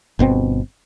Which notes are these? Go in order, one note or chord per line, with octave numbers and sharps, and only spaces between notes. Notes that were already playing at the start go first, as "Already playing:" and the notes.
G1 B2 D3 C4